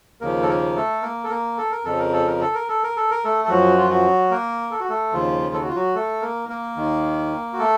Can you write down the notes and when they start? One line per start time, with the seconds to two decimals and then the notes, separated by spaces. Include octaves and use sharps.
0.21 D#2 C#3 F3 A#3 A#4
0.42 A4
0.48 A#3 A#4
0.76 A3 A4
1.02 A#3 A#4
1.24 A4
1.30 A#3 A#4
1.58 A4
1.72 A#4
1.85 F2 C#3 F3 A4
1.99 A#4
2.13 A4
2.27 A#4
2.41 A4
2.55 A#4
2.69 A4
2.84 A#4
2.97 A4
3.11 A#4
3.24 A3 A4
3.45 A4
3.49 F#2 F3 F#3 F#4
3.78 F4
3.90 F#3 F#4
4.31 A#3 A#4
4.71 A4
4.80 F#4
4.89 A3 A4
5.12 D#2 C#3 F3 F4
5.53 A4
5.61 F#4
5.68 F4
5.75 F#3 F#4
5.95 A3 A4
6.22 A#3 A#4
6.49 A#3 A#4
6.77 D#2 D#3
7.53 F#4
7.59 A3 A4